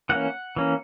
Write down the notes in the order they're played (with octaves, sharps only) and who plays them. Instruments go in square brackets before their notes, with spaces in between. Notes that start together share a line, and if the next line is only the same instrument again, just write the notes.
[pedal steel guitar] E3 A#3 C#4 F#5
E3 A#3 C#4